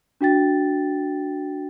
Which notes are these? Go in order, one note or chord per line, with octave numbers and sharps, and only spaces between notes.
D4 F#4 G5 A6